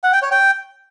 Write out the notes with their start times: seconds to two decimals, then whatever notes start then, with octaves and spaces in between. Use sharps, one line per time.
0.04 F#5
0.13 G5
0.22 C#5
0.31 G5